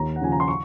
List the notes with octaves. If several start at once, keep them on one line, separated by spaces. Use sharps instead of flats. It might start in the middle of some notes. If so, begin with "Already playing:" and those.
Already playing: D#2 A#5
F#5
C#3 F3 G#5
A#5
C6
C#6